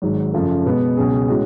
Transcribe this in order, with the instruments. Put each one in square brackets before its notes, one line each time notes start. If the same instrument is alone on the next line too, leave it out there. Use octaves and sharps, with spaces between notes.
[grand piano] G#1 G#2 F#3
F#2 C#3 F3 A3
B2 G#3 B3
C#2 B2 F#3 C#4 G#4
A2 G#3 C#4 F#4